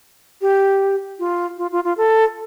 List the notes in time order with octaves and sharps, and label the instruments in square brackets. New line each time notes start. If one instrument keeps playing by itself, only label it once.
[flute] G4
F4
F4
F4
F4
A4